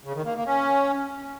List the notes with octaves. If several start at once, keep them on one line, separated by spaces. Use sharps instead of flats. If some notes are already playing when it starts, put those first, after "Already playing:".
C#3
D#3
A#3
A#3
C#4